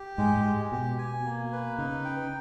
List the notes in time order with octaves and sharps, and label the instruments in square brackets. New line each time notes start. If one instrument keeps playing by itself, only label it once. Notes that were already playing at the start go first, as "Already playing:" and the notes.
Already playing: [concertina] G4
[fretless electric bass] G#2 [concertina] G#3
[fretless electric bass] G#2
[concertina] G#3
[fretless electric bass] B2 [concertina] G4
[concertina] G#5
A#3
B4
[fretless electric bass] C#3 [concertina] D#4
[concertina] G5